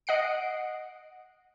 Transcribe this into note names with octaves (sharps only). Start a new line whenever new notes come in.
D#5 F#5 C7 D7